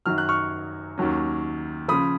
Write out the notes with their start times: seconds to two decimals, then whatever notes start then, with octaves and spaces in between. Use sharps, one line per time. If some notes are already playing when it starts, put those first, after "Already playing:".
0.06 F#2 D#3 F#3 F6
0.18 F#6
0.29 C#6 F6
0.98 D#2 D#3 F#3 C#4
1.88 C#3 F3 B5 D#6